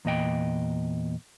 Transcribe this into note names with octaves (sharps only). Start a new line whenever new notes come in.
E2 A#2 D#5 G5